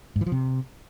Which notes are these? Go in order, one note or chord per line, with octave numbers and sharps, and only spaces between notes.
G#2
E3
F3
C3